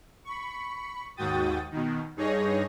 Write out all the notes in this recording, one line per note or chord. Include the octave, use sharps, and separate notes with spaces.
B5 C#6
D#2 G#2 F#4 G5 D#6 A6
B2 D#3
G2 D#4 G#4 C#5 A#6